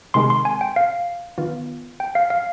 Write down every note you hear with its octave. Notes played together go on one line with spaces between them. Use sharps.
C3 D#3 G#3 C6
C6
G#5
G5
F5
D#3 B3 F4
G5
F5
F5